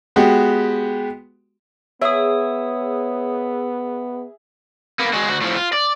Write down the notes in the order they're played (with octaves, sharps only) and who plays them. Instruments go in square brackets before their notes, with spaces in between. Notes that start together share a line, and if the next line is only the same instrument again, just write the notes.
[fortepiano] G#3 B3 F#4 G4
[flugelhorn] B3 [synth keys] G#4 [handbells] C#5 D#6 [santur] E5
[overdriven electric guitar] A#3 B3
G#3 F#4
D2 F#4
A2 F3
F4
D5